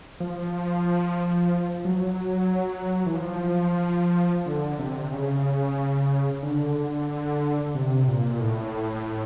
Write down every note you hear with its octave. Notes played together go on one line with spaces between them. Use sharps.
F3
F#3
E3
F3
D3
C3
C#3
D3
C3
A#2
A2